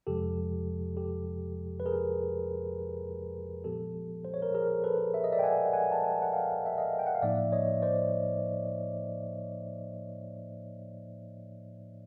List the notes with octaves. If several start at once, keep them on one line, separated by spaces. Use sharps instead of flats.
F2 C3 F3 G#3 G4 A4
G4 A4
B4
G#4 A#4
A#2 F3 G#3 B3 G4 A4
C5
C#5
A#4 C5
G#4 A#4
A4 B4
E5
D#5
D5 E5
G5
F#5 G#5
F#5 G#5
A5
F#5 G#5
F#5
F5 G5
E5
D#5 F5
G5
F#5
F5
A2 F3 A#3 D#4 D5 E5
C#5 D#5
C5 D5